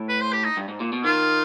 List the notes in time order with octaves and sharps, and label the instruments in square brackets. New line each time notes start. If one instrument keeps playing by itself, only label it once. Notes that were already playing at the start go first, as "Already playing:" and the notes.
Already playing: [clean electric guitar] A2
[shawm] B4
C5
G4
D#4
[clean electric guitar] G2
G#2
A#2
B2
[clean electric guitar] D#3 [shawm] F4